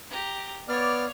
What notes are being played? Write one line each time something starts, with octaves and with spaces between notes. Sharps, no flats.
G4 A#5
B3 C#5 D5 F5 F6